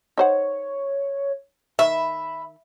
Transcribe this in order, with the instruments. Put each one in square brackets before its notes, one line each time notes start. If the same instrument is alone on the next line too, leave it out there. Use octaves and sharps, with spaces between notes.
[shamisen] D#4 C5 F#5 [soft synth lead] C#5
[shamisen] D#3 [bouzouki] E5 [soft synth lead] B5